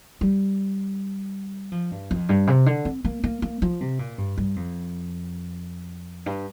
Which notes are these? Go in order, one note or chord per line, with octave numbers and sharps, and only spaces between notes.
G3
F3
G2
F2
G2
C3
D3
C4
A#3
A#3
A#3
F3
C3
A#2
G2
G2
F2
G2